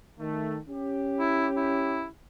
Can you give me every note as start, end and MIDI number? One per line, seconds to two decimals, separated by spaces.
0.19 0.58 51
0.19 0.58 57
0.70 2.07 61
0.70 2.07 67
1.19 1.47 64
1.57 2.06 64